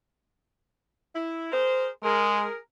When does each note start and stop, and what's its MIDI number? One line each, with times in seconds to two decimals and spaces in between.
1.15 1.50 64
1.52 1.88 68
1.52 1.88 70
1.52 1.88 72
2.04 2.45 56
2.04 2.56 68
2.04 2.56 70